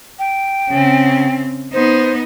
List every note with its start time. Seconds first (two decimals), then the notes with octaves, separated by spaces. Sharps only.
0.19 G5
0.69 C#3 C4
1.73 B3 D#4 C5